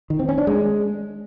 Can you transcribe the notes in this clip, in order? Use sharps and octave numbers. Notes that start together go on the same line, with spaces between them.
D#3
C4
C#4
D4
G#3